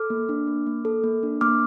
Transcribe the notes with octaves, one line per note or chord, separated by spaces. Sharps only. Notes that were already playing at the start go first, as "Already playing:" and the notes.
Already playing: A4 D6 F6
A#3
D4
A#3
A#3
A4
A#3
D4
A#3 D6 F6